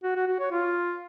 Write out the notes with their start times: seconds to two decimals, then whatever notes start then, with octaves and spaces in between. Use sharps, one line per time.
0.04 F#4
0.15 F#4
0.27 F#4
0.39 C#5
0.51 F4